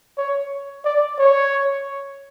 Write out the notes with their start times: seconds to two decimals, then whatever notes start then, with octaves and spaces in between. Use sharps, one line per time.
0.18 C#5
0.85 D5
1.19 C#5